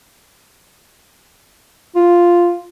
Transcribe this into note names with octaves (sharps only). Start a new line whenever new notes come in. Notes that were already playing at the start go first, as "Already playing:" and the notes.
F4